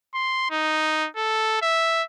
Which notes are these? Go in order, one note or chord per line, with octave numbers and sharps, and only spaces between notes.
C6
D#4
A4
E5